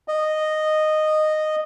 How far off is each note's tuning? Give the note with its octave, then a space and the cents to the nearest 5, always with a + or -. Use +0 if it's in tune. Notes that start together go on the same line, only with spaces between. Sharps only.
D#5 -10